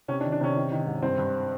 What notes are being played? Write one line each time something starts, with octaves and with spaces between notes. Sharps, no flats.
C3 C#4
D4
D#3
D4
C3 C#4
D#3
D#3
G#2
G2 C4
G2